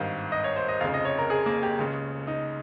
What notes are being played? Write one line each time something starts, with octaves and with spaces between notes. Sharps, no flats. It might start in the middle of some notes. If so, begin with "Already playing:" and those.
Already playing: G#1 G2 D#3 F5
D#5
C#5
C5
D#5
F1 F2 C#3 F5
D#5
C#5
A#4
G#4
A#3
G4
C#2 C#3
D#4